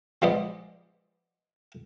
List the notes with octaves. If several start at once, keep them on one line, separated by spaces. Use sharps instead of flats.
F3 G#3 B3 C5 D5 D#5